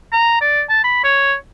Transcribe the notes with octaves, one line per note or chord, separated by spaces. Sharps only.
A#5
D5
A5
B5
C#5